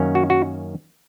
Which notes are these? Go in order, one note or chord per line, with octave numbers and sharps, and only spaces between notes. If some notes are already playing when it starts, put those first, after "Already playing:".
Already playing: F#2 D#3 A#3 C#4
F#4
F#4